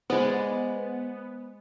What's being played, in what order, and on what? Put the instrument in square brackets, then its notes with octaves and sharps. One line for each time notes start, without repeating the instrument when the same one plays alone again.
[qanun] G#3 D5 [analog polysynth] B3 [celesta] C5